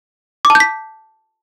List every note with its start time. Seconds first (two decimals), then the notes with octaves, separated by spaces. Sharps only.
0.45 D6
0.50 A5
0.55 G6
0.60 B6